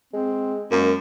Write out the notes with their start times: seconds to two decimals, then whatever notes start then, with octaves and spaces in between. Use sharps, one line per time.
0.13 G#3 C4
0.71 F#2 G#3 A#3